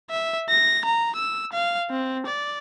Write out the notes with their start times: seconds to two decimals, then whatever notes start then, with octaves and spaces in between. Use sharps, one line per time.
0.10 E5
0.50 A#6
0.85 A#5
1.16 E6
1.53 F5
1.90 C4
2.26 D5